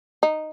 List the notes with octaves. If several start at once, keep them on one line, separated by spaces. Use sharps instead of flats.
D#4